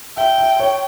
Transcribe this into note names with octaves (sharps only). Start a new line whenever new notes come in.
E5 G5
E5
C#5